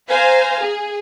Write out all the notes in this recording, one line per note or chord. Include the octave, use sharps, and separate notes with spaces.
C5 F5 G#5 A#5
G#4